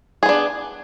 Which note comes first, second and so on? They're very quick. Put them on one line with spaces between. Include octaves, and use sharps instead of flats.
G#4 B3 D4